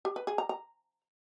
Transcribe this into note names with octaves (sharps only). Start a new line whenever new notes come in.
G4
B4
G#4
A#5
A#5